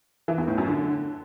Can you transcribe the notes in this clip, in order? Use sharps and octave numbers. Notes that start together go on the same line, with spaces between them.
E3
E2
A2
F#2
D3